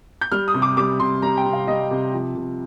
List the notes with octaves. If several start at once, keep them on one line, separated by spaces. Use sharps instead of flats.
G6
G3 F6
D#6
C3
D6
G3 D6
C3 C6
G3 A#5
G5
C3
F5
G3 D#5
C3
F3
C3